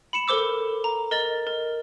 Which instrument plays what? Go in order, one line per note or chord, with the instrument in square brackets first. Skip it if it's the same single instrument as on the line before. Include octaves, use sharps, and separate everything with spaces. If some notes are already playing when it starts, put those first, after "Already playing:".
[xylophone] B5 C#7 E7
A4 A#4 C5 D6 E6
A#5
A#4 D#5 A6 F#7
A#4